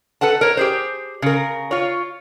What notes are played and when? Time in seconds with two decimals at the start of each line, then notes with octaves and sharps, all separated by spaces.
0.21 A4 B4 F#5 A5
0.41 A#4 C#5
0.57 G4 G#4 C5
1.22 C#3 A#4
1.71 F4 C#5